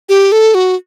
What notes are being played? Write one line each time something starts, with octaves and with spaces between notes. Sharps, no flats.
G4
A4
F#4